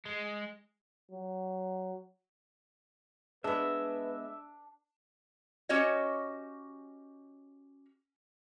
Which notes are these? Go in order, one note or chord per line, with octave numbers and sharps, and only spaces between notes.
G#3
F#3
G#3 B3 D4 B4 E5
C#4 F#4 G4 C#5 D#5